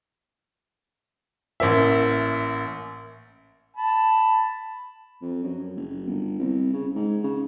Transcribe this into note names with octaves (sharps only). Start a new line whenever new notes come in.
A1 A#3 E5
A5 B5
F2
F#2
F#1
G1
C2
C#3
G#2
C#3